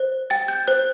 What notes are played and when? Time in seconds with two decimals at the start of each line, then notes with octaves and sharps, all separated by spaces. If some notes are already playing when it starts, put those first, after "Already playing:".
Already playing: C5
0.30 G5 A6
0.48 G6
0.67 C5 F#6